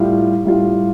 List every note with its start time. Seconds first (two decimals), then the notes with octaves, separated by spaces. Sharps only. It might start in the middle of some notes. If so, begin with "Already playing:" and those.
Already playing: A2 G3 F4
0.45 A2 G3 F4